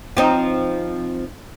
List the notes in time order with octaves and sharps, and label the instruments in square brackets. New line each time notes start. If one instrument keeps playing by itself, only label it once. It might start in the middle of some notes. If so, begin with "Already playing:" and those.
[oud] F3 C4 D#4